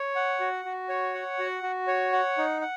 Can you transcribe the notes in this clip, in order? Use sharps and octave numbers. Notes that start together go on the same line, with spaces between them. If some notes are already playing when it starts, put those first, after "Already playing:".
Already playing: C#5
F#5
F#4
F#4
C#5
F#5
F#4
F#4
C#5
F#5
D#4
F#5